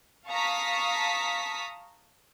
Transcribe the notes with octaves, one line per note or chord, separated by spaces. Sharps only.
F5 A5 A#5 C#6 D#6 B6